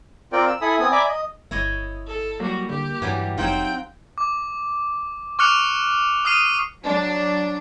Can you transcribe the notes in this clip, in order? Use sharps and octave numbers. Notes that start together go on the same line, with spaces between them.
C4 F4 A#4 D5 G5
E6
E4 A4 G#5 B5 D#6
B3 C4 G#5 D#6
D5 E5 G#5 A#5 B5 D6
D#5
G1 E4 C#5 D#5
A4
F#3 G3 A#3 F#4
D3 G4
G2 E3 F#3 G3
F1 F#3 C4 D#4 F4 G5 A#5
D6
C#6 D6 F6 F#6 C#7 F7
D#6 F6 C7 D#7
F#3 D4